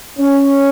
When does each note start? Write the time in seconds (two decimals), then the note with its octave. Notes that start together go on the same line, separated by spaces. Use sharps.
0.19 C#4